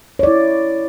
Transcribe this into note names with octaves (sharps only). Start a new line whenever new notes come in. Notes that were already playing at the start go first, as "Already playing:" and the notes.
E4 C#5 D5